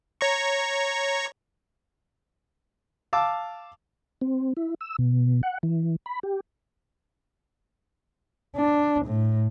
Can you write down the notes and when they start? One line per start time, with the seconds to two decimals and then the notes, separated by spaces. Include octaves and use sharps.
0.21 C#5 A#5 C#6
3.13 F5 A5 D6 E6
4.21 C4
4.57 E4
4.81 E6
4.99 B2
5.43 F#5
5.63 E3
6.06 B5
6.23 G4
8.56 D4
9.06 A2